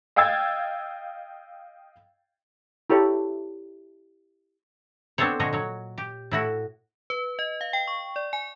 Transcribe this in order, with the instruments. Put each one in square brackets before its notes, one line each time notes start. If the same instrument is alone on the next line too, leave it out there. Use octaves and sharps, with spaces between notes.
[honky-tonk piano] D#5 F5 G5 E6 G#6 A6
[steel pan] E4 G4 A4 C#5
[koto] B3 C4 D4 A4 C5 C#5
A#2 D3 F3 F#4 C#5 D#5
F#3 C#5
G4
A2 E4 F#4
[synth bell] B4
D#5
F5
G5
C#6
D5
G#5